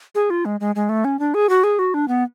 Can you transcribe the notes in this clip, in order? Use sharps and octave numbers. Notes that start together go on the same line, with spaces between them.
G#4
F4
G#3
G#3
G#3
A3
C#4
D4
G#4
F#4
G#4
F#4
D4
B3